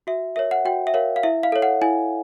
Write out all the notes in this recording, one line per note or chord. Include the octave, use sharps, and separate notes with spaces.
F#4 E5
A#4 C#5 E5
F#5
F#4 G5
E5
A#4 C#5 F5
F5
E4 E5
F5
A4 C#5
F#5
E4 G#5